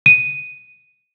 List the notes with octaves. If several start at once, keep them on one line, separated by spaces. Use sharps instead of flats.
D#7